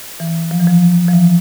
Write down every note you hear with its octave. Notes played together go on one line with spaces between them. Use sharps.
E3
F3
E3
F3
F3
E3